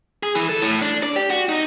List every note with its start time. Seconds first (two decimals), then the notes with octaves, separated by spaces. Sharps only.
0.23 G#4
0.35 E3
0.49 A4
0.62 A2
0.81 D4
1.03 D5
1.16 G4
1.30 F#4
1.49 D#4